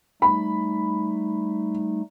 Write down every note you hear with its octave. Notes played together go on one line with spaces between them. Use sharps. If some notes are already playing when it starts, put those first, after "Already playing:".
G3 A3 D#4 B5